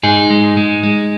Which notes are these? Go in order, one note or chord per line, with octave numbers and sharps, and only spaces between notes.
G#2 D#4 G#4
G#3
G#3
G#3